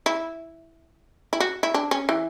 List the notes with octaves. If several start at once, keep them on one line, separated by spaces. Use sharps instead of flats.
E4
E4
F#4
E4
D4
C#4
E3